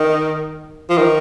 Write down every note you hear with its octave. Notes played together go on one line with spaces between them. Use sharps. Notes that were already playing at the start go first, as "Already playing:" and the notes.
Already playing: D#3
F3
D#3